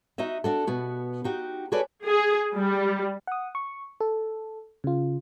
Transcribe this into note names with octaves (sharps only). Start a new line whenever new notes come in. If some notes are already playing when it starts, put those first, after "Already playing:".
D#4 F#4 D#5 E5
D4 F#4 A4
B2 B3 F#4
D#4 F#4 G4
F#4 G#4 A4 B4 C#5 D5
G#4
G3
F#5 D#6
C#6
A4
C#3 F4